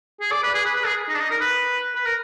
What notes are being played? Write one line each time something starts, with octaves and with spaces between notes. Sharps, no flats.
G#4
D5
B4
G#4
B4
B4
G#4
D#4
D4
D#4
A#4
B4
B4
A#4